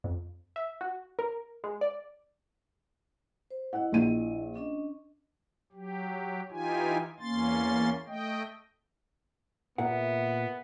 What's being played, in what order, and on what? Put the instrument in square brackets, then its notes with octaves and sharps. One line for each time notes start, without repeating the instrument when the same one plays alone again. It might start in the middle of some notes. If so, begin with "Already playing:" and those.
[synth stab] F2
E5
F#4
A#4
G#3
D5
[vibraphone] C5
[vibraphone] E4 D#5 [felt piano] F#5
[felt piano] A#1 D#7
[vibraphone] C#4 D4 D#5
[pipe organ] F#3 G4
E3 D#4 F4 G4 G#5
E2 A#3 C#4 C6 A6
A3 D#5 G5
[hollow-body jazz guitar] A#2 A#4 F#5 [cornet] B3 [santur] G#4 E5